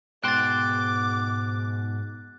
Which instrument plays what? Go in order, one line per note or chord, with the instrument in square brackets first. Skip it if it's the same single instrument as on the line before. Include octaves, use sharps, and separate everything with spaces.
[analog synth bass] G#2 [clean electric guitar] B2 G5 C6 [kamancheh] D6 [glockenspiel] F#6 A6